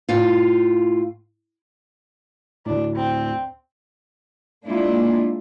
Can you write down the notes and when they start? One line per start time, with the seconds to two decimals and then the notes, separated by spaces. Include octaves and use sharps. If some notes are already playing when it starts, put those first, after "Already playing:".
0.09 A2 F4
2.66 D2 A2 D4
2.96 C4
4.66 G#3 A#3 D4 E4 F4